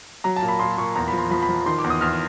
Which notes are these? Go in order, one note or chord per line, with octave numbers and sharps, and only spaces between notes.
F#3 A#5
A5
A#2
B5
A#2 C6
A#2 C#6
E2 A#5
F3 B5
C6
F3 B5
B5
F3
D#3 C6
D6
E2
D#6
E2 F6